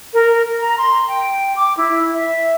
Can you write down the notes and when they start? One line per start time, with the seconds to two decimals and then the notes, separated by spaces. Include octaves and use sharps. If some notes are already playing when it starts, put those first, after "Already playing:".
0.14 A#4
0.60 A#5
0.78 C6
1.08 G5
1.56 D6
1.77 E4
2.13 E5